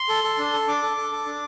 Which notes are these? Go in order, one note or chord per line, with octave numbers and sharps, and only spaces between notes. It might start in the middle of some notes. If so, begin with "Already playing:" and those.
Already playing: C6
A4
A4
D4
A4
D4 D6
A4
A4
A4
D4